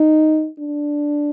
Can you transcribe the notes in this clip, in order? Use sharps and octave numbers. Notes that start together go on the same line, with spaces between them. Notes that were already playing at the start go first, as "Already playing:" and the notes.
Already playing: D#4
D4